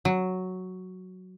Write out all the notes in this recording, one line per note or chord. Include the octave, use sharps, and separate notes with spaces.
F#3